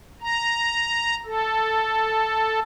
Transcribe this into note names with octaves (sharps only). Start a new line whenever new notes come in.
A#5
A4